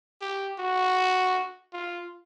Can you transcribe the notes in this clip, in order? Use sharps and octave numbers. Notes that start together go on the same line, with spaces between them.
G4
F#4
F4